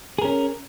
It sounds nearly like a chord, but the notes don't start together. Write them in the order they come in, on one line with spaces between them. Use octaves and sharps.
G#4 A#4 C#4